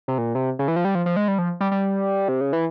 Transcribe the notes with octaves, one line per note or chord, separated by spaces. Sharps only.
C3
A#2
C3
C#3
E3
F3
G3
F3
F3
G#3
G3
F3
G3
G3
C3
C#3
E3